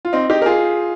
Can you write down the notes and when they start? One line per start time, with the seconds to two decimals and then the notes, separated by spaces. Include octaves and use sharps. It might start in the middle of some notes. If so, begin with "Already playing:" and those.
0.05 F4
0.13 C4 D#4
0.30 D#4 G4
0.42 A#4
0.46 F4 G#4